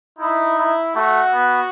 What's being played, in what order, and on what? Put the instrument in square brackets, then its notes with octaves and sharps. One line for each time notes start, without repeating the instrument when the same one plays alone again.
[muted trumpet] D#4 [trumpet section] E4
[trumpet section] E4
[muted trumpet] A3 [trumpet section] F#4
[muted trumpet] B3